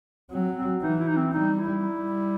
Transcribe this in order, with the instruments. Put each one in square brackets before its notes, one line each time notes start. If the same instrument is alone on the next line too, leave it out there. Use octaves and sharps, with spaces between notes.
[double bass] F#3 [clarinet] C4
[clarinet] C4
[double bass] E3 [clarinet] D#4
[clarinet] E4
D#4
C4
[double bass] G3 [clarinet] D#4
[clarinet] E4
[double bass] G3